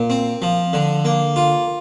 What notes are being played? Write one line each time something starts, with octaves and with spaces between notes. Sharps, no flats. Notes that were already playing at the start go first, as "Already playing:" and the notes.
Already playing: A#2
C4
F3
D3
A#3
F4